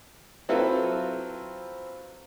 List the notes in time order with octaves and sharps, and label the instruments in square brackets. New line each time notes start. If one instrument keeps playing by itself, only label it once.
[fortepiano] F#3 C4 E4 F4 A4 B4